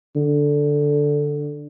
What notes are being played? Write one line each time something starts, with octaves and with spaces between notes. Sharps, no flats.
D3